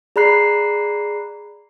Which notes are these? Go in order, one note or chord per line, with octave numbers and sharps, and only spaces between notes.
G#4 D5 A#5 B5 F#6 C7